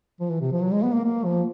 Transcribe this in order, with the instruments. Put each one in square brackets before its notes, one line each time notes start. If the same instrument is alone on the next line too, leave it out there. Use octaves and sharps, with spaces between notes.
[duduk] F3
E3
C3
F3
F#3
G#3
B3
A#3
A#3
F3